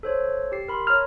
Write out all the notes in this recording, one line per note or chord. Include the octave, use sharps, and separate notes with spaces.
A4 C5 C#5
G4 C7
A#4 B5 C6
C#5 A#5 F6